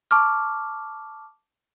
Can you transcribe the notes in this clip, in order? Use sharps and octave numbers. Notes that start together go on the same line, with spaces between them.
A5 C#6 D6 F6